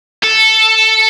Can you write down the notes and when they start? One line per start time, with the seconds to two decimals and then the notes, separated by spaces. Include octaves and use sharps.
0.23 A4